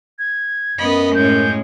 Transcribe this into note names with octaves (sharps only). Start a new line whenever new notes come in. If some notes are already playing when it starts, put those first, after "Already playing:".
G#6
F#2 B3 D#5 B5
A2 G#3 C#4 G6